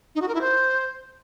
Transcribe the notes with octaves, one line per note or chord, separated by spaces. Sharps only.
D#4
F#4
A#4
E4
C5